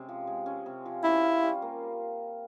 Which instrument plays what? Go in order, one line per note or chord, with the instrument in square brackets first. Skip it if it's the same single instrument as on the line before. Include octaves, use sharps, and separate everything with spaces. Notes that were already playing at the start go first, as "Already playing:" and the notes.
Already playing: [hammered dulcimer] C3 G#3 C#4
F3
G#3
C#4
C3
F3
[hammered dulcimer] C#4 [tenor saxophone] E4
[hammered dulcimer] F4
G3
A#3